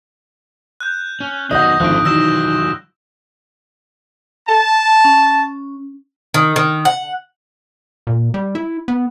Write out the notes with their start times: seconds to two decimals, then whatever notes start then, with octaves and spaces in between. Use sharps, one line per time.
0.80 F#6 G6
1.20 C#4
1.51 D#3 F#3 B3 D#5 F#5 D#6 G6 A#6
1.80 G#1 D3 D#3 F3 A3 F#6 D7
2.05 D#3 E3 F#3 D#4 E6 A#6 E7
4.47 A5
5.05 C#4
6.34 D#3
6.56 D#3
6.85 F#5
8.07 A#2
8.34 G3
8.55 E4
8.88 B3